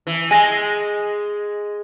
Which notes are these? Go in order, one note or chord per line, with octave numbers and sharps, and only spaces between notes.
E3
G#3 G#5 A#6